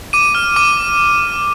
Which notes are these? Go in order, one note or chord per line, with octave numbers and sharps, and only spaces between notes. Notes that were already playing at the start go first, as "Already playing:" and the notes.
D6 D#7
F6
D6 D#7